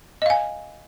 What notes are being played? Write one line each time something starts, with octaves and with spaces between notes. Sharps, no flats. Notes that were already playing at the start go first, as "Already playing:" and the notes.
D#5 F5 G#5